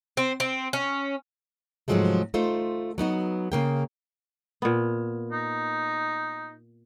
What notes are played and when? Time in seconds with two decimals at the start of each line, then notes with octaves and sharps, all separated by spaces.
0.17 C4
0.40 C4
0.73 C#4
1.88 G#2 C3 F3 F#3 G#3 A3
2.34 A3 D#4 F4 C5
2.98 F#3 B3 D#4 F#4
3.52 C#3 A#3 G5
4.62 A#2 B3
5.32 D#4